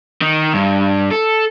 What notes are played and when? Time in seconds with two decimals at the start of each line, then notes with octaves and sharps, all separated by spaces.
0.22 D#3
0.54 G2
1.11 A4